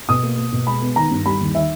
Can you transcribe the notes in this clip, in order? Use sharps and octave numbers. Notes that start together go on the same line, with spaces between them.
B2 D#6
A#3
A#3
B2
G#3 B5
B3
D#3 A#5
G2
G3 B5
D#2
D#3 E5